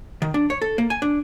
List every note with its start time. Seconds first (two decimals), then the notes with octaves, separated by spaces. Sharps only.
0.22 D#3
0.34 D4
0.50 C#5
0.62 A4
0.78 A#3
0.90 G#5
1.02 D4